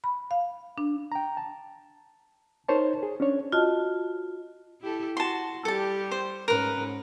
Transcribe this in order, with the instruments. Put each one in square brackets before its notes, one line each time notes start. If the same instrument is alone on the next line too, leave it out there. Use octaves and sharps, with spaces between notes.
[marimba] B5
F5
D4
[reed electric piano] G5 A#5
A5
D#4 A#4 C5 C#5 A5
G#4
C#4 D4 C#5
[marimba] F4 F#4 D#5 A5
[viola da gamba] E4 G4 A4
[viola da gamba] F#4 [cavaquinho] A5 C6
[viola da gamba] G3 G4 [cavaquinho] A4 A5
[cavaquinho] C5
[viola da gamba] G#2 C#4 [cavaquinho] A#4 B4